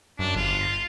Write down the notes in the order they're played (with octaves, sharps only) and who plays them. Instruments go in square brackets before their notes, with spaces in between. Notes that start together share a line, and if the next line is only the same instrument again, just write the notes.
[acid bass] F#2 [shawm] D4
[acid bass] G1 [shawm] F4